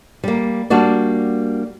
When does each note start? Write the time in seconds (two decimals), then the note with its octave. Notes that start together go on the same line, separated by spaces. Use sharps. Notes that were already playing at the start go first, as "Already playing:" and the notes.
0.24 G3 A#3
0.70 G3 A#3 D4 F#4 D5